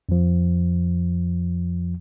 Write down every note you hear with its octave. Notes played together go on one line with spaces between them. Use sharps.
F2 F3